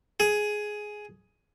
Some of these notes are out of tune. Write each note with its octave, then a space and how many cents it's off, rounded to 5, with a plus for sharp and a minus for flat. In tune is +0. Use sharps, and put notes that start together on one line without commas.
G#4 +10